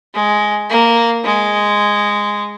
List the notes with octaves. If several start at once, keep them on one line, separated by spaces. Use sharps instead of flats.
G#3
A#3
G#3